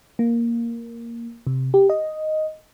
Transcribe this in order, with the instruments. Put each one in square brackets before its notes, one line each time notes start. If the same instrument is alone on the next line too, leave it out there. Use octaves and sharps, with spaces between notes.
[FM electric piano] A#3
C3
G4
D#5